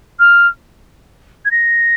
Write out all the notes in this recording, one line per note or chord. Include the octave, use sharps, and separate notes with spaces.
F6
G#6
A#6